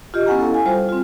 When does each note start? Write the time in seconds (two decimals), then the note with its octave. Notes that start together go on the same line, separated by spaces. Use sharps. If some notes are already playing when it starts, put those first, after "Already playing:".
0.14 F4 G4 D#5
0.26 B3 C#4 E4 F#5 G#5 A#5
0.38 E4 A4 F5
0.54 G#5
0.66 G3 F4 C5 F5
0.89 C4 F4